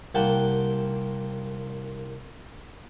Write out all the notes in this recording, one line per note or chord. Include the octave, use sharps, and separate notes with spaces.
C2 A#3 G4 F#5 G5 A5